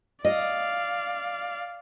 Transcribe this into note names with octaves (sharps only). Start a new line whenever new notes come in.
D5 D#5 F5